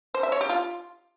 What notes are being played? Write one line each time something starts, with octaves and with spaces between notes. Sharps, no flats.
C5
E5
C#5
G4
F4